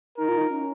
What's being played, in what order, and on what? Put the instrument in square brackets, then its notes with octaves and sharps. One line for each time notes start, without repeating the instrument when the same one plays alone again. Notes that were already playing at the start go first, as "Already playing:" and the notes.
[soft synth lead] D#4 [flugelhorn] A#4
[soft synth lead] F4
D#4
C#4